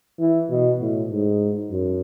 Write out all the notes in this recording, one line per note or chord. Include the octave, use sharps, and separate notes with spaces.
E3
B2
A2
G#2
F#2